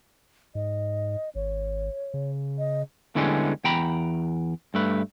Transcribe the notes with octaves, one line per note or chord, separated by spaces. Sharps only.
G#2 D#5
G#1 C#5
C#3
D#5
E2 D3 E3 G3 G#3 C#4
E2 G5 A#5 B5
G2 A3 B4